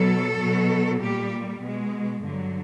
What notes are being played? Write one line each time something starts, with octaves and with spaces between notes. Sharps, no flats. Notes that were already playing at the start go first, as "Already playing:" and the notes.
Already playing: B2 F#3 A4
B2 F#3
A#2 G3 G4
B2 G#3
G2 D3 F#3